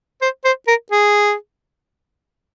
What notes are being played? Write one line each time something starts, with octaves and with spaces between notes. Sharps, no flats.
C5
C5
A#4
G#4